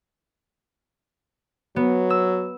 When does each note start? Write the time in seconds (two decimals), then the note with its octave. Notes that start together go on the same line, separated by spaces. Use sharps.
1.76 F#3 B3
2.10 E6